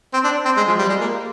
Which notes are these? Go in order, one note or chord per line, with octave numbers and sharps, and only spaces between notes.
C4
D4
C4
G#3
F3
G3
G#3
A#3